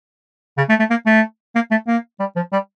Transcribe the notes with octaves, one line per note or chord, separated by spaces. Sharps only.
C#3
A3
A3
A#3
A3
A#3
A3
A#3
G3
F3
G3